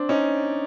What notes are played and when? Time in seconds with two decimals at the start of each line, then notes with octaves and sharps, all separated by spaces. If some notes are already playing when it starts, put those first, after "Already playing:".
Already playing: C4 D4
0.09 C#4 D#4